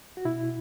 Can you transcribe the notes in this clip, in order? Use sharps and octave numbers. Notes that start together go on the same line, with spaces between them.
F#4
B2 E4